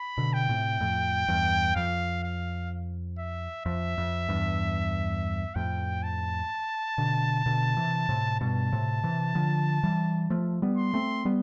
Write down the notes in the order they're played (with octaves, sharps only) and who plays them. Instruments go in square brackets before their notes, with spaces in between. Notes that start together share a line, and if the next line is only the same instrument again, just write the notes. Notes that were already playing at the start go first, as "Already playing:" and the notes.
Already playing: [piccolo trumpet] B5
[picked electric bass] B2 D3
[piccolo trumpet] G5
[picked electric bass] A2 C3
F2 A2
E2 G2
[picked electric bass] F2 [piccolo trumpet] F5
[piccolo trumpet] F5
E5
[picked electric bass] F2 [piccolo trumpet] E5
[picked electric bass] F2
E2 G2
[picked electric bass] F2 A2 [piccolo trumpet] G5
[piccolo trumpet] A5
[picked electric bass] B2 D3
B2 D3
C3 E3
A2 C3
[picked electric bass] G2 B2 [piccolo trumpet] A5
[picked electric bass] A2 C3
C3 E3
D3 F3
E3 G3
F3 A3
G3 B3
[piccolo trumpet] C6
[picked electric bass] A3 C4
G3 B3